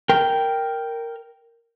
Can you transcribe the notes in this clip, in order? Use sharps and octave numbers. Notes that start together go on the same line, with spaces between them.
A#4 G5